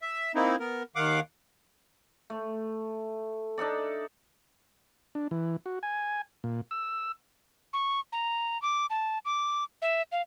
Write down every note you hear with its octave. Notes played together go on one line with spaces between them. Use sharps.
E5
A#3 C4 D#4 E4
B3 A#4
D#2 D#3 F5 F#5 D6
A3
D4 D#4 A4 D5
D4
E3
F#4
G#5
A#2
E6
C#6
A#5
D6
A5
D6
E5
F5